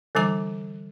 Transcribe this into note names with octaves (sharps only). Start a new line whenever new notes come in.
D3 E3 G3 A#5 D6